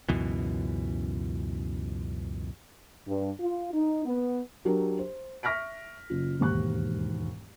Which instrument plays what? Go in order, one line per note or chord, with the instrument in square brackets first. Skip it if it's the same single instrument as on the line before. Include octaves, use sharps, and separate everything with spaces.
[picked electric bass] C#2 F#2 B2 E3
[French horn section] G2
F4
D#4
B3
[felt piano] F#3 D4 G4 A#4
C5
E5 C#6 F6 A#6 B6 D7
F#1 F4
E1 D#2 G#2 C#6 F#6